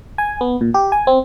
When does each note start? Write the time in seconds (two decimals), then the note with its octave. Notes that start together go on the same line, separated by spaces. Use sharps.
0.18 G#5
0.41 B3
0.61 A#2
0.74 G4
0.92 G#5
1.07 C4